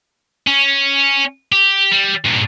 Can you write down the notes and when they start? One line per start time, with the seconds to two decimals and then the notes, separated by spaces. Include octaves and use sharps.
0.47 C#4
1.52 G4
1.92 G3
2.25 G2 A#2